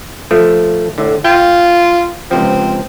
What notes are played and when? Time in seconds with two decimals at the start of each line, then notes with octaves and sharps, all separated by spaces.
0.31 F3 A3
0.98 A2 D3
1.24 F4 G5
2.31 C#2 C3 F3 C4